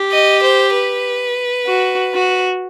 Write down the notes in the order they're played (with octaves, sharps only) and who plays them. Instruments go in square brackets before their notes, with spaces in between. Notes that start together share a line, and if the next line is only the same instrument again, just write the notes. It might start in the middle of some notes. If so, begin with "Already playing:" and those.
Already playing: [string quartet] G4
[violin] D#5
C5
B4
[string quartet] F#4
F#4